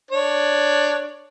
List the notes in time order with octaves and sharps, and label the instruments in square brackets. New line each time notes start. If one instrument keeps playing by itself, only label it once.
[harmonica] D4 C#5